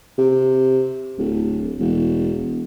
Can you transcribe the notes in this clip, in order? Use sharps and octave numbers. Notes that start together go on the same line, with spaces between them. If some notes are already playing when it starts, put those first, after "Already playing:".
C3
D1
E1